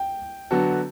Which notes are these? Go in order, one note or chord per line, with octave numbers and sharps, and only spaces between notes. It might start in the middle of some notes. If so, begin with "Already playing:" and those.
Already playing: G5
D3 F#3 B3 F#4 A4